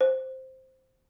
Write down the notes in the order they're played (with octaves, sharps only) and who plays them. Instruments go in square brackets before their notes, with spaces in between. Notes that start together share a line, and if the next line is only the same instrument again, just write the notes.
[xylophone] C5